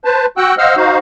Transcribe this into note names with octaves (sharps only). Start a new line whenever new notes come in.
B4 C5 A5
F#4 F#5 G5 E6 F#6
C5 D#5 F5 F#5 E6 F6
D#4 F#4 C5 F5